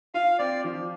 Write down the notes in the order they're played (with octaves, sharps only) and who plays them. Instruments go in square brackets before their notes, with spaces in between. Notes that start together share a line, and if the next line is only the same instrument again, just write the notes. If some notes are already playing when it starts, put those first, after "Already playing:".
[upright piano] F4 [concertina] F5
[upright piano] C4 [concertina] D5
[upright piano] F3